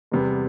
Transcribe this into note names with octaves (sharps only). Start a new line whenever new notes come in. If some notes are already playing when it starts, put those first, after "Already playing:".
E2 C3 G3 B3